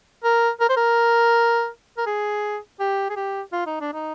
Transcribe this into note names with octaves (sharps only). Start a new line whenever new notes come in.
A#4
A#4
C5
A#4
A#4
G#4
G4
G#4
G4
F4
D#4
D4
D#4